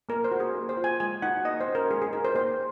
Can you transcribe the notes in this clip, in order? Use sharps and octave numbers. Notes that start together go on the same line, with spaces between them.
A#3 A#4
C5
D#4 F#4
G#4
A#3
C5
F4
G#5
G#3 G#5
D#4 F#4 F#5
A#3 D#5
C5
C#4 F#4
A#4
G#3 G#4
G#4
D#4 F#4 A#4
C5
A#3 C5